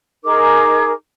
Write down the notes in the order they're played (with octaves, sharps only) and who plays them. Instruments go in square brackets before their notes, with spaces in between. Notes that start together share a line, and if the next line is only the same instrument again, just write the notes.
[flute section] D#4 G#4 A#4 D6